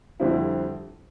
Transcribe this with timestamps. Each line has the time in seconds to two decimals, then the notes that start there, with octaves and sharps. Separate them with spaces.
0.20 F2 D3 G3 C4 E4